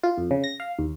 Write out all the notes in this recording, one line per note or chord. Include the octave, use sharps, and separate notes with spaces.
F4
F2
C#3
A#6
F5
D#2